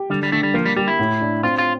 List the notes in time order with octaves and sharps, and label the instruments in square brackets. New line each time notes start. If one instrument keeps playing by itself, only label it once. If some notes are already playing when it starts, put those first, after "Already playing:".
Already playing: [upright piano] G4
[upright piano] D3 [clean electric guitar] G3
[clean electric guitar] G3
[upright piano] D3 [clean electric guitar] A3
[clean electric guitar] G3
[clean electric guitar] F3 [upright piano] A#3
[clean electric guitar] G3
[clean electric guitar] G3 [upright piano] G4
[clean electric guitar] E4
[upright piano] A2
D4
[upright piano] C4 [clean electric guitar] F4
[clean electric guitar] F4